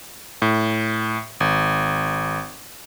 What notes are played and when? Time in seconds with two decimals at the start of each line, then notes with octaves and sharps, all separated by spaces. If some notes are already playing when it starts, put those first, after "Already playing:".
0.42 A2
1.40 G#1